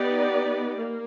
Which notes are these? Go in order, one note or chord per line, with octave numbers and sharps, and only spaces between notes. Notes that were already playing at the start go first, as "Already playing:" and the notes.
Already playing: B3 D#4 G4 B4 D5
A#3